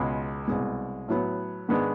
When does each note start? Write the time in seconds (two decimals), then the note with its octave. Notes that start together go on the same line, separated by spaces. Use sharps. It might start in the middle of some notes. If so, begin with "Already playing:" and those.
Already playing: C#2 B2 G#3
0.48 C2 B2 G#3
1.08 A2 F#3 B3
1.69 G#2 D#3 G#3 B3 D4